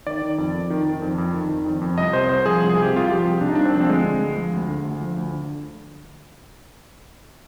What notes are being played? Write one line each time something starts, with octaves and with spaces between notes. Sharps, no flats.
D#3 D5
D#3
F2
F2
D#3
D#3
F2
F2
D#3
D#3
F2
F2
C2 D#5
C3 C5
C2 C5
F3 G#4
C2
G#4
C3
G4
C2 F4
F3 G4
C2
C3 D4
D#4
C2 D4
C4
F3 D4
C4
D2 G#3
D3
D2
F3
D2
D3
D2
F3
D2
D3